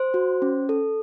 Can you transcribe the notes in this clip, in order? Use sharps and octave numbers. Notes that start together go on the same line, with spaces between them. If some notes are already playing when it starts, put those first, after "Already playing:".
Already playing: C5
F#4
C#4
A4